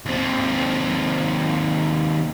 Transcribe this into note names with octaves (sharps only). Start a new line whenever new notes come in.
D#2 C4